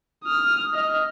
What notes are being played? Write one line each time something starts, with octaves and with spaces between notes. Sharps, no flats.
D#6 F6
D#5 F6